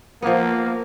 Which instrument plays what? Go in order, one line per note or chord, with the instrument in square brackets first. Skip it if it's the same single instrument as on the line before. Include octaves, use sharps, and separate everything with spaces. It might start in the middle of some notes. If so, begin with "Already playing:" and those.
[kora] F3 B3 [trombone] A#3